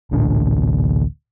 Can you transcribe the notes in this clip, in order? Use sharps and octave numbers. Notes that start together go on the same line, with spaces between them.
A1 D2 A#2 D4